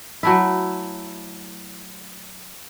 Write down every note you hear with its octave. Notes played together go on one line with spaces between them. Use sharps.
F#3 A3 E4